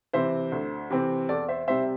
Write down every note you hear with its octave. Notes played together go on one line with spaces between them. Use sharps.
C3 E3 C4 C5 E5
D2
C3 E3 C4
E2 A4 D5
C5 E5
C3 G3 C4 C5 E5